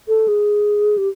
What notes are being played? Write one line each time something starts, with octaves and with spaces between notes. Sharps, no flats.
A4
G#4
G4